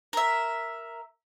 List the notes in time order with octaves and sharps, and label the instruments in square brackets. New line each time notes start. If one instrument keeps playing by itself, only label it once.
[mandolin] A#4 E5